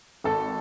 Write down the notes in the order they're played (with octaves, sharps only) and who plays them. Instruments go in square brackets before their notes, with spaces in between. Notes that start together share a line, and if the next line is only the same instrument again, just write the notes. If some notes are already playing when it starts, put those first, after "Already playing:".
[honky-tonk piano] G#1 A4